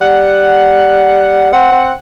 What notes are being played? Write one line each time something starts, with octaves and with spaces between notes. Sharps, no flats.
G3 F#5
C4 F#5
C4